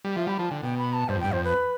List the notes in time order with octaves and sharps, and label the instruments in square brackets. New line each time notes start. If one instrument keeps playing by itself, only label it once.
[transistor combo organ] G3
[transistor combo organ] F3 [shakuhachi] E5
[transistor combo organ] G3 [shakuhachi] B5
[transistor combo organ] F3 [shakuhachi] A5
[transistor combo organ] D3 [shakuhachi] G5
[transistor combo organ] B2 [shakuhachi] G5
[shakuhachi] B5
A5
[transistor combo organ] G2 [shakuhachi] C5
[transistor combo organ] F2
[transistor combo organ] G2 [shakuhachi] G5
[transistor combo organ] F2 [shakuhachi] C5
[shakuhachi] B4